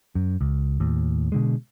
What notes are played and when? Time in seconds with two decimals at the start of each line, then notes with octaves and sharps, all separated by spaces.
0.15 F#2
0.41 C#2
0.80 D#2 A2
1.32 B2 D3 G#3